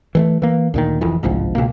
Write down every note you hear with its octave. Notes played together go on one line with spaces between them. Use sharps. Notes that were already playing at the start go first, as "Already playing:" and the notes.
E3 G#3 A3
E3 A#3
D2 A#2 D#3
F1 F2 E3
G1 C2 G#2 F3
C#2 B2 A#3